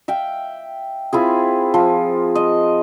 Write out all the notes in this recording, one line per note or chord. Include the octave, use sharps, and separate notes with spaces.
E5 F5 G5
C4 E4 F4 G#4
F3
D#5